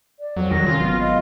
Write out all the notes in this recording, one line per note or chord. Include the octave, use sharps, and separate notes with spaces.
D5
F2 F#3
E2 D#3 G3 A#6
C3 C#4 F4
G#1 F#3 A#3 B3
D#5